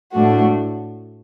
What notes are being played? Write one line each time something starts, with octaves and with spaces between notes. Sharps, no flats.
A2 A3 D4 F#4